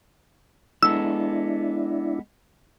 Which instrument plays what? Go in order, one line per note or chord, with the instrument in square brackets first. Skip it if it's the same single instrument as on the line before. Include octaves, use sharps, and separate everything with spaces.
[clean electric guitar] G#3 B3 A4 [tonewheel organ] D4 E4 [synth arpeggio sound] E6